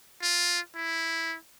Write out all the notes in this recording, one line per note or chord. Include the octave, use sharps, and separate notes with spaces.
F4
E4